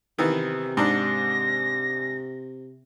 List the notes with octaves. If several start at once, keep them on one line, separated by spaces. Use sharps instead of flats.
C3 D#3 E3 B3
G#2 D4 A#6